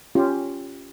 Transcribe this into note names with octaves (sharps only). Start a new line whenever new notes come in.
C#4 F4 G4